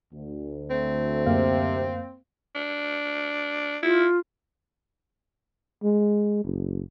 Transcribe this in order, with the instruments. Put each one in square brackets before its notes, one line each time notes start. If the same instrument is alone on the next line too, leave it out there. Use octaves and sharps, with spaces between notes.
[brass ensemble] D2
[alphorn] A3 [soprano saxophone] C4
[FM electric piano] F#2 A#3 F5 [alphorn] C3
[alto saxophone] D4
[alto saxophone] E4 [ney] F4
[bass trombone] G#3
F#1